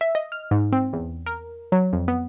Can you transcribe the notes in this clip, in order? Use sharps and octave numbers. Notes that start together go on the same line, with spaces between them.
E5
D#5
F6
G#2
C4
E2
A#4
F#3
F2
B3